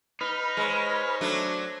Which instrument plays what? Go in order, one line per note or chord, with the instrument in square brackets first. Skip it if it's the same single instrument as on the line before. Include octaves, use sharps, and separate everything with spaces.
[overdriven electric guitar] D#4 [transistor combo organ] B4 F6
[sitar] G#3 [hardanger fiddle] C5 C#5
[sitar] F#3 A3 D4